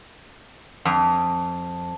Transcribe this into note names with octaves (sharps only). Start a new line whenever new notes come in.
F2